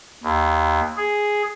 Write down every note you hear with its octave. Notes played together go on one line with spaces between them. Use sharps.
D#2
G#4